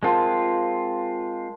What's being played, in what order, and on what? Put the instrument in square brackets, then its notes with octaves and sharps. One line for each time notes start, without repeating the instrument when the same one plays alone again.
[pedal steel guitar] G#3 C4 F4 [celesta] A#4 A5 C6